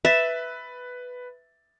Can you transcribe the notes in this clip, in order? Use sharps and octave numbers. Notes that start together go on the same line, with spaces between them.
B4 E5 A6